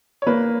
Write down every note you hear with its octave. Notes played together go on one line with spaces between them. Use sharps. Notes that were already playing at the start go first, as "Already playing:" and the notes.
C#5
A#3 B4